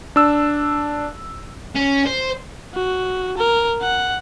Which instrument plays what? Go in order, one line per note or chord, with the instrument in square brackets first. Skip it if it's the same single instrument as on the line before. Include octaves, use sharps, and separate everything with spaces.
[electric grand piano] D4 E6
[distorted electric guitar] C#4
C5
[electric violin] F#4
A#4
F#5